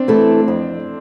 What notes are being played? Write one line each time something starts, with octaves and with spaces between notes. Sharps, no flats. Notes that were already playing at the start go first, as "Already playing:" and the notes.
Already playing: C4 D4
E3 A3 E4 A4
F2